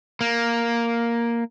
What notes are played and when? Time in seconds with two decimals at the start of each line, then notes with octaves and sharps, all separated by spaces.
0.21 A#3